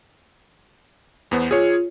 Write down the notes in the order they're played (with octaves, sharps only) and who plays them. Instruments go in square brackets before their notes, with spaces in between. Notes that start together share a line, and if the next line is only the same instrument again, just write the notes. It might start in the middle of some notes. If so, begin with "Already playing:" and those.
[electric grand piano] E2 B3 C5
[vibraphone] F4 [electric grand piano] G#4 C#5